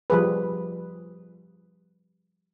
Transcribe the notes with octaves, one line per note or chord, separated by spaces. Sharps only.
F3 G3 G#4 B4